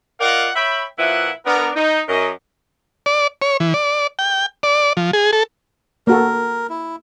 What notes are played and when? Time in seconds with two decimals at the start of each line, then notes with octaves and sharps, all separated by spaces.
0.21 F4 A#4 D5 D#5 F5 F#5
0.56 C#5 E5 G5 B5
0.99 A#2 F3 E4 B4 E5 F#5
1.46 B3 D4 A#4
1.75 D#4
2.08 F#2 D#5
3.06 D5
3.42 C#5
3.60 E3
3.74 D5
4.19 G5
4.63 D5
4.97 F3
5.13 G#4
5.33 A4
6.07 A#3 F#4 A4 A#4
6.69 E4